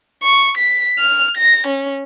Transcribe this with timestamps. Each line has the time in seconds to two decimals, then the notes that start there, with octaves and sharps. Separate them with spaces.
0.23 C#6
0.58 B6
0.99 F6
1.38 A#6
1.67 C#4